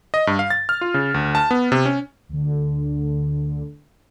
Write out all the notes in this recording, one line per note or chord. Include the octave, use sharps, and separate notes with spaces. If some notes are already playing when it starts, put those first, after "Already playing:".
D#5
G2
F5
A6
F6
F4
C#3
D2
A5
B3
C3
C#4
D2 D3